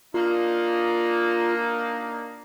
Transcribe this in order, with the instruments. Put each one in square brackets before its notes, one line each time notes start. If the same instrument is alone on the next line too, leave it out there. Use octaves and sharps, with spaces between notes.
[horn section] A#3 D4 D#4 [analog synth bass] F4